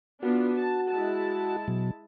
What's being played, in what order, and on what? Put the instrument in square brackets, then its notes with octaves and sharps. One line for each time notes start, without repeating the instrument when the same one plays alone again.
[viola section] B3 D4 F4 [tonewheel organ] F#4
[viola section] A5
G#3 E4 A5
[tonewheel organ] B2 F#3